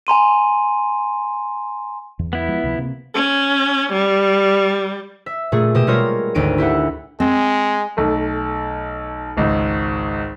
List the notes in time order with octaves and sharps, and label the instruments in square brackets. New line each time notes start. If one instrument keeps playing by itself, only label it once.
[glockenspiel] G#5 A#5 C6 D#7
[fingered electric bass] E2
[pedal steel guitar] B3 E4
[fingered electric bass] F3 G#3
C#2 C3 F3
C3 A#3 C4
[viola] C#4
G3
[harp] E5
A#2 A3 G#4
B2 G4 D#6 E7
G3 G#3 F4 A#4 C#5 D#5
G#1 D2 D#4 D7 D#7
E4 G4 E5 F#5
[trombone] G#3 [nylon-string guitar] C4
[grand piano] B1 A3
G#1 C#2